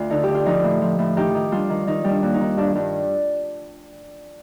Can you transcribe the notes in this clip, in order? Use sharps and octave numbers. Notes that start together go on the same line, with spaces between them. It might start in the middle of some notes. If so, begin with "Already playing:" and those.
Already playing: D2 F4
D3 D#4
D3 G4
F4
F3 D#4
A2
F3
A2
D#3 D#4 G4
D#3
G3 D4 F4
D#3
D#3 D#4
G3
D4
D#2
D#4
D#3
G2 D4
G2